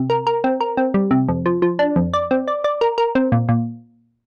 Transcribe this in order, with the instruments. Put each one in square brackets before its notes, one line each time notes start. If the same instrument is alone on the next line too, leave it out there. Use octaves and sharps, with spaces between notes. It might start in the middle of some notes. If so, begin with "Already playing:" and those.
Already playing: [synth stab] C3
A#4
A#4
C4
A#4
C4
G3
C3
F2
F3
F3
D4
F2
D5
C4
D5
D5
A#4
A#4
C4
A#2
A#2